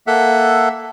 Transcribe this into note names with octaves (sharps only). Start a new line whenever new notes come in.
A#3 A4 E5 F#5